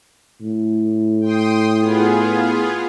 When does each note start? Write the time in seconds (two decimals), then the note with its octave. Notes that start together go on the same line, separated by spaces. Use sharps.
0.41 A2
1.21 G5 C6 D#6
1.79 B3 F4 G#4